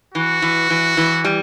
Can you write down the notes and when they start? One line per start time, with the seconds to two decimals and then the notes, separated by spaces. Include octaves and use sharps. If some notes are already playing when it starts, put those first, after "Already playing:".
0.14 E3 F#4
0.42 E3
0.70 E3
0.97 E3
1.24 G3